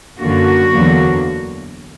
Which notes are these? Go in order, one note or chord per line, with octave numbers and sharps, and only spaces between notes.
F#2 D3 A#3 F#4
E2 D3 F#3 A#3